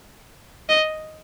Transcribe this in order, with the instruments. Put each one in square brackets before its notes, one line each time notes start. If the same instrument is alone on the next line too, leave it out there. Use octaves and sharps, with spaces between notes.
[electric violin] D#5